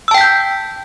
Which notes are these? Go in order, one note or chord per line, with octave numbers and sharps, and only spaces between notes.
G5 A5 E6 G6 B6